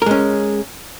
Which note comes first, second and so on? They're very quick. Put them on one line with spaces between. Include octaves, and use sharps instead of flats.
A#4 G#3 C#4